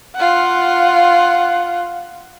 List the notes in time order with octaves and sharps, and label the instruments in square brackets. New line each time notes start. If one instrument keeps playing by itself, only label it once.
[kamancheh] F4 F#5